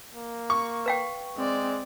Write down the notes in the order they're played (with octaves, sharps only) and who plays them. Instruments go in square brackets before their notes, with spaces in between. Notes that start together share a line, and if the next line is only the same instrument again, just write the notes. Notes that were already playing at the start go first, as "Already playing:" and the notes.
[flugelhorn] A#3
[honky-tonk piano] C#6
[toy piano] B4 F5 G5
[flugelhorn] G#3 [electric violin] C4 D5